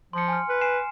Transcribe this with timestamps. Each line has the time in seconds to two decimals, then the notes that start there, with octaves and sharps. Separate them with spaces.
0.13 F3 C6 C#7
0.28 G#5 F6
0.49 B4
0.61 G#5 C7 E7